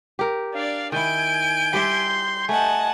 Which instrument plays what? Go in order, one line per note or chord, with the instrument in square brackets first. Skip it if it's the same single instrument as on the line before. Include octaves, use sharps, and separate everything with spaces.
[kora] G4 A#4
[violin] D4 D5 [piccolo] F5
[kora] D#3 E4 [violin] G#5 D7 [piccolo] G6
[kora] G3 G4 E5 [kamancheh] C6
[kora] A3 [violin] D#5 F#5 [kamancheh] G#5 A5